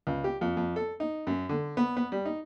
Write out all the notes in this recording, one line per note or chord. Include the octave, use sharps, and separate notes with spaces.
C#2
G4
F2
F2
A4
D#4
F#2
D3
B3
B3
G3
D#4